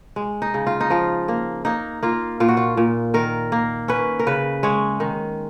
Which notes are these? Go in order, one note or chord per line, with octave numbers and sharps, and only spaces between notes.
G#3
D#4
C#3
F4
D#4
F3 F4
A#3
A#3 D#4
A#3 F4
A#2 F4
F#4
F4
A#2
D#3 A#4
A#3
C#4 B4
A#4
C#3 B4
G#3 C#5
D#3